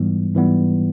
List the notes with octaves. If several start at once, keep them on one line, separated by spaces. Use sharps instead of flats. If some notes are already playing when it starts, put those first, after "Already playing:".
Already playing: G#2 E3 G3 B3
G#2 E3 G3 B3